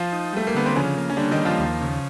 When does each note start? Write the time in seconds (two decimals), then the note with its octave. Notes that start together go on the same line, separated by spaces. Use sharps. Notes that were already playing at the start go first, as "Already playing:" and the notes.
Already playing: F3 F4
0.12 D#4
0.33 G3 A3
0.47 A#3
0.55 D3 B3
0.66 C4
0.75 C#3 F3 C#4
0.97 A#3
1.10 C#4
1.17 D3 G3 D4
1.31 D#3 D#4
1.38 A#3
1.45 F3 F4
1.59 D#2
1.81 C#3